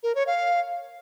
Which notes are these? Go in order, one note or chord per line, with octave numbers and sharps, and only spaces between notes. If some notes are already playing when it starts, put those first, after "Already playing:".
A#4
C#5
F5